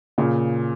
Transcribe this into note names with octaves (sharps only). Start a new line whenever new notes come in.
A#2 C#3